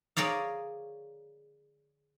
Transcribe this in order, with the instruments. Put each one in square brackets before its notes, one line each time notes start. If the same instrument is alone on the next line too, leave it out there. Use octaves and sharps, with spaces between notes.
[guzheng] G#4 A#4 C#5 D5 F5